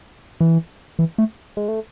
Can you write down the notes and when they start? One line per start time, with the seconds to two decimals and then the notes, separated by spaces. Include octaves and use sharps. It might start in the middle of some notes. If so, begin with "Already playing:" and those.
0.40 E3
0.99 E3
1.18 A3
1.57 G#3
1.68 A3